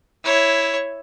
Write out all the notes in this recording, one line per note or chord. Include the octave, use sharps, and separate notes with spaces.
E4 C#5